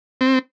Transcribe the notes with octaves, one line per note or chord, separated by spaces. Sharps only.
C4